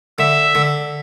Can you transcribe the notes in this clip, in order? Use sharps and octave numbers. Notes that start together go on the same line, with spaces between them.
D3 E5
D3